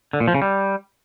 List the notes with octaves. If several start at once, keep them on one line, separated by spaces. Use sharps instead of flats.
D3
A#2
F3
C#3
G3